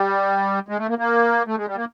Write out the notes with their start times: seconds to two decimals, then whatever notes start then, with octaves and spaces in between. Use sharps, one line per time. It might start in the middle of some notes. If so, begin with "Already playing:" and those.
Already playing: G3
0.68 G#3
0.78 A3
0.88 A#3
0.98 A#3
1.47 A3
1.57 G#3
1.67 G3
1.76 A#3